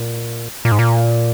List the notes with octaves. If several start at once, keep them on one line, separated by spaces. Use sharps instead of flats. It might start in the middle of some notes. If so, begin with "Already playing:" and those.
Already playing: A#2
A#2
G#2
A#2